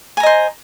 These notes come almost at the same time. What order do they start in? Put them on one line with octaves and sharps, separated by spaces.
G#5 A#5 D#5 C5